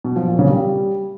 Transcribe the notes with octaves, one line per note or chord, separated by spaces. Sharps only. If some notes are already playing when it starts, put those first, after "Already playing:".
B2
F3
A#2
C#3
G3